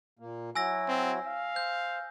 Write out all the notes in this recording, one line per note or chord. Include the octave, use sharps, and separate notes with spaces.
A#2 A#3
F#3 E4 F#4 G#5 E6 A#6
C4
F5
C5 G6